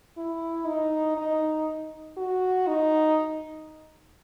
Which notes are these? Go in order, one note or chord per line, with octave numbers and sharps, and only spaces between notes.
E4
D#4
D#4
F#4
D#4